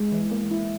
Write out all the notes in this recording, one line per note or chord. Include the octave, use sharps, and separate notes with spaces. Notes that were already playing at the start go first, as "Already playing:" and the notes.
Already playing: G#3
E3
A#3
E4